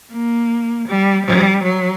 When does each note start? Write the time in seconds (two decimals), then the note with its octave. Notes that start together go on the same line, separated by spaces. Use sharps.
0.12 A#3
0.87 G3
1.25 G3
1.63 F#3